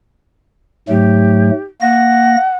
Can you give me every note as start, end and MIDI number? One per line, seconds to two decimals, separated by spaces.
0.89 1.51 44
0.89 1.51 54
0.89 1.51 57
0.89 1.62 67
1.81 2.36 58
1.81 2.57 78
1.81 2.36 94